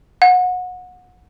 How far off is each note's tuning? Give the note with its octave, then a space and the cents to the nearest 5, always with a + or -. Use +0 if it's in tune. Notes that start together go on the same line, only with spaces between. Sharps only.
F#5 -25